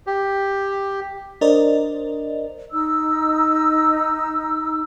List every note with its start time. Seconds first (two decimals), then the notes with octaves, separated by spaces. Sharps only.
0.07 G4
1.41 D4 A#4 C5 D5 D#5
2.72 D#4 E6